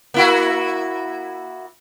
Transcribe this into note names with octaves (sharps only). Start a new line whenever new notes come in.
A#3 E4 F#4